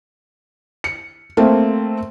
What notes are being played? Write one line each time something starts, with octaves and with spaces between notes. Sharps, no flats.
C#7
A3 A#3 C4